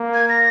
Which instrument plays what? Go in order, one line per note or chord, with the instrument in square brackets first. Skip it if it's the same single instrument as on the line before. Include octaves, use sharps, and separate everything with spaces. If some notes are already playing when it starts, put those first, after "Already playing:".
Already playing: [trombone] A#3
[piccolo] G#6
A#6